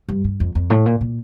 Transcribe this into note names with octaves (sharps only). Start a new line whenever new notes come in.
G2
G2
F2
F2
A2
A#2
A#2